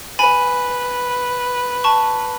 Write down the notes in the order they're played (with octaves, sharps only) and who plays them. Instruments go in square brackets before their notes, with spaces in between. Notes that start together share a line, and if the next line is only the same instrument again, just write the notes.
[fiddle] B4 [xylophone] G#5 B5
[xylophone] A5 C#6